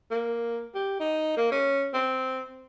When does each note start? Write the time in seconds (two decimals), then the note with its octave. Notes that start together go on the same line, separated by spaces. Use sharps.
0.11 A#3
0.75 G4
1.00 D#4
1.37 A#3
1.52 C#4
1.94 C4